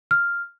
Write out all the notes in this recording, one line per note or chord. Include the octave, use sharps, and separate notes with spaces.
F6